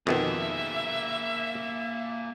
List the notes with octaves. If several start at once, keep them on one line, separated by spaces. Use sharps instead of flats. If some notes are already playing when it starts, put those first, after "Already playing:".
F2 B2 D#3 A#3 G#4 E5